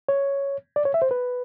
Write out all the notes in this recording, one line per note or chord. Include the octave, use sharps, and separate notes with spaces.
C#5
D5
C#5
E5
C5
B4